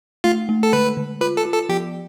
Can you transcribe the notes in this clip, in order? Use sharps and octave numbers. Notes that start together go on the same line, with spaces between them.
A3 F4
A3
A4
D3 B4
D3
F4 B4
A4
F4
A4
F3 G4